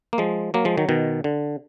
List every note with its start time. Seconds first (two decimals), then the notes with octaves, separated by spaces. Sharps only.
0.13 A#3
0.18 F3 G#3
0.54 F#3 A#3
0.65 F3 G#3
0.78 D#3 F#3
0.89 B2 D#3
1.24 D3